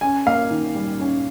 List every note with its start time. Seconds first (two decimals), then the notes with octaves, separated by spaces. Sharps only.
0.01 C#4 G#5
0.26 A#3 F5
0.51 D#3
0.75 G3
1.00 C#4